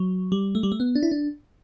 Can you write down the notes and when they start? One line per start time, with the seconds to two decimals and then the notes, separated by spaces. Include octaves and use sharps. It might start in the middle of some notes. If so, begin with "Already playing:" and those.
Already playing: F#3
0.32 G3
0.55 A3
0.63 G3
0.72 A3
0.80 B3
0.95 D4
1.03 E4
1.11 D4